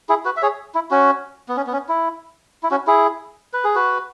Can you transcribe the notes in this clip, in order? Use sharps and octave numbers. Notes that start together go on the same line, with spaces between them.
E4 G#4
F#4 B4
E5
G#4 C#5
E4
C#4 F#4
B3
C#4
B3
C#4
E4
E4
C#4 F#4
E4 G#4
B4
G#4
F#4 B4